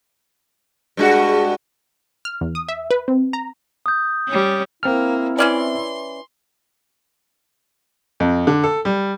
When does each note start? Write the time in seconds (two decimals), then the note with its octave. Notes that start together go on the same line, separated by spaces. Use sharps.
0.97 G2 G#3 F#4
2.25 F6
2.41 E2
2.55 D#6
2.69 E5
2.91 B4
3.08 C4
3.33 A#5
3.86 D#6 G6
4.28 G3 C#4
4.83 A#3 C4 E4 F6
5.38 E3 C#4 D5 C6
8.20 F2
8.47 D3
8.64 A4
8.85 G3